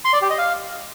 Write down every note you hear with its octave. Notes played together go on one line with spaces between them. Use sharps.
C6
D5
G4
D#5
F5